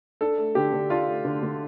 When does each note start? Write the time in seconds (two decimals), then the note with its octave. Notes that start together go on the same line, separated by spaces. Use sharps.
0.21 D4 A4
0.38 A3
0.55 D3 G4
0.73 D3
0.90 D4 F4
1.08 A3
1.25 D3
1.43 D3